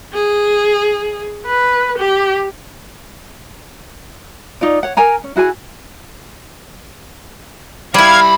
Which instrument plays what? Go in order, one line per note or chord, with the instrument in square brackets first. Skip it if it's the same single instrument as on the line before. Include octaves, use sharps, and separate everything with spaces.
[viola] G#4
B4
G4
[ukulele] D#4 F4 D5
C#5 F#5
A#4 G#5 A#5
C#4
E4 F#4 G#4 G#5
[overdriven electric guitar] C2 B5 [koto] G3 E4 [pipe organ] F5 G#6